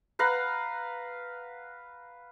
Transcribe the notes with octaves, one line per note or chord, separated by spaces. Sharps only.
B4 F5 F#5 A#5